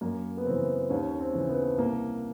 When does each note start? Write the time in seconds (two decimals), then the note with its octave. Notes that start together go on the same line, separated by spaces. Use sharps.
0.01 F#2 A#3
0.37 B3
0.46 C#3 E3 C4
0.90 D#2 C#4
1.20 C4
1.33 C#3 E3
1.49 B3
1.78 C2 A#3